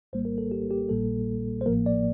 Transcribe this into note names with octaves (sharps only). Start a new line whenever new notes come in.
A#1 A2 G3 A#3 C5
A#4
A4
G4
G4
A#1 A#2 G3 A#3 A4
C5
A1 A2 F3 A#3 A#4
D5